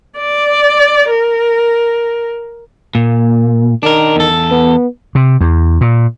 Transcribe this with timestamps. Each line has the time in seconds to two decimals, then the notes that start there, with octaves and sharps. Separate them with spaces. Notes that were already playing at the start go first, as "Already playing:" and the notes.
0.17 D5
1.10 A#4
2.95 A#2 A#3
3.83 D#3 D4 A#4
4.16 E2 A4
4.51 B3
5.15 C3
5.41 E2
5.81 A#2